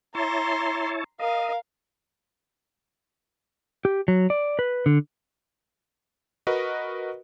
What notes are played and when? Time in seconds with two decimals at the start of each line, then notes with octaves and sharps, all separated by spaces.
0.15 E4 C#5 A5 A#5 C6
1.20 A#4 D#5 F5
3.85 G4
4.08 F#3
4.30 D5
4.59 B4
4.86 D3
6.47 F#4 A#4 B4 D#5